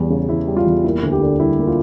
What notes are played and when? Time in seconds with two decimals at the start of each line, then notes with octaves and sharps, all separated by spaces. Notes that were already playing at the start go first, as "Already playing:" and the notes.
Already playing: E2 G3
0.10 C#3
0.28 E3 E4
0.48 G3
0.57 F4
0.66 E2
0.84 A#3 E4
1.03 D2
1.12 G4
1.21 D3
1.40 G3 E4
1.58 A#3
1.67 F4